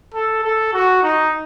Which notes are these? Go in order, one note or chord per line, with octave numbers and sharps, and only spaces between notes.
A4
A4
F#4
D#4